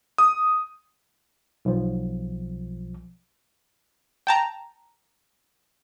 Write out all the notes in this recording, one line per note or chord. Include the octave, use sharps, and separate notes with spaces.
D#6
B1 F3
G5 A5 A#5